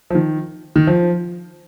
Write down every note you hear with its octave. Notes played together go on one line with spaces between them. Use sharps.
F3
D#3
D#3
F3